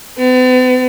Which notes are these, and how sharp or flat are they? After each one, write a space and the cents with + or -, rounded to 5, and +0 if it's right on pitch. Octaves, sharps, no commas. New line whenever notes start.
B3 +45